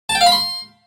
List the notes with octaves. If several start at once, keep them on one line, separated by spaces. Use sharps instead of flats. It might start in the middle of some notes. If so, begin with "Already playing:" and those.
A5
G5
F5
B5
C6